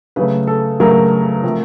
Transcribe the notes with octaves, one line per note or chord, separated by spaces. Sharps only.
C#3 F#3 A3 B4
A4
C#3 F#3 A3 A#4
C3 F3 A3